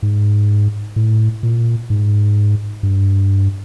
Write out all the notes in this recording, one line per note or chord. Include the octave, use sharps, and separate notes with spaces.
G#2
A2
A#2
G#2
G2